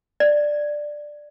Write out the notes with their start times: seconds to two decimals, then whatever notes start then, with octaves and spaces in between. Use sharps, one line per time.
0.20 D5